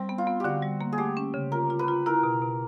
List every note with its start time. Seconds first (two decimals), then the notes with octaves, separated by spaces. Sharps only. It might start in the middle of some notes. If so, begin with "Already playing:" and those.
Already playing: G3 C4
0.09 B3
0.18 F4
0.27 B3
0.40 D3 F#4 G4
0.63 G3
0.81 A#3
0.92 G#4
0.98 A3 G4
1.17 C#4
1.34 C#3
1.52 F4 A#4
1.70 F4
1.79 B4
1.88 F4
2.06 E4 A#4
2.23 B2
2.42 B2